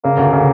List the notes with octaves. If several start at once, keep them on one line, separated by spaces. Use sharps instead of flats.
C#3 A#3
D2
C#3